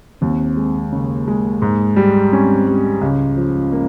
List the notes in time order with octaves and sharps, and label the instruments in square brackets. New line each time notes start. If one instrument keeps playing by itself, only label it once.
[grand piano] D#2 [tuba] C4
[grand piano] G#3
[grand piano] C#3 [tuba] A#3
[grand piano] G#3
G#2
G3
[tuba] C4 [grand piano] C#4
[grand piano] G3
[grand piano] C#2 [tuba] C#4
[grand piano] F3
A#3